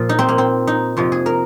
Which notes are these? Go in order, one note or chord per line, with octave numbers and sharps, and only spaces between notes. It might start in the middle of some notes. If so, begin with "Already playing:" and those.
Already playing: A#2 F3 F4
D#4
C4
A#3
C4
D#4
F2 C3 F3
G#4
A#4